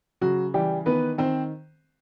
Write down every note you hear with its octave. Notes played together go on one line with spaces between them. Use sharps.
C#3 F#3 F#4
E3 G3 G4
D#3 B3 B4
D#3 C4 C5